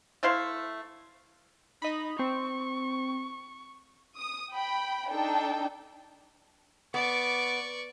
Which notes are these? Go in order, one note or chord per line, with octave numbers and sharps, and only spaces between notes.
A3 E4 C5 F5
D#4 D#5 B5
C4 C#6
D#6
G5 B5
D4 D#4 A4 G5
B3 D5 C#6 D6